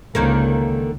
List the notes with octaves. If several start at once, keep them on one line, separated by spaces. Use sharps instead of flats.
C#2 D3 D#3 A#3